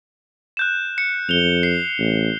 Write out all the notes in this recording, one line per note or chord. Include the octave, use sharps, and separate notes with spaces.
F#6 G6 E7
C#7
F2 F7 G7
C7
A1